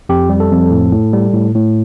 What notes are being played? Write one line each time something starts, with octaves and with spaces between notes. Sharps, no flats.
F2 G4
G3
A4
F2
A2
A2
G3
A2
A2